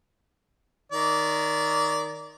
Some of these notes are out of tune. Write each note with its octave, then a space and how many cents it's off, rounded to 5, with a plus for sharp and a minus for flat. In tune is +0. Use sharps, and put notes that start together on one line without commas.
D#3 +0 D5 -20